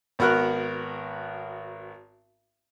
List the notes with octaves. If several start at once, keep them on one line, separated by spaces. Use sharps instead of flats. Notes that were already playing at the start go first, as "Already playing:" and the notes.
G#1 B3 F#4 A#4 F6 F#6